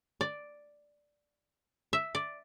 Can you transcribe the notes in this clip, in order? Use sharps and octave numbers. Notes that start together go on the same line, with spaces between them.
D5
E5
D5